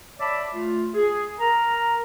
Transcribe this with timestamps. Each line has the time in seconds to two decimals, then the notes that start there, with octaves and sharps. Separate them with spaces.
0.19 C#5 D5 E5 A5 B5 D6
0.52 A3 F4
0.93 G#4
1.39 A#4 A#5